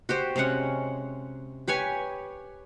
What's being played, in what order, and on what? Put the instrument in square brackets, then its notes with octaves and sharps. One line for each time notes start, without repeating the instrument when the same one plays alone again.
[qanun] F#4 G4 C5
C3 G#3 C#4 F#5
G4 B4 C#5 G#5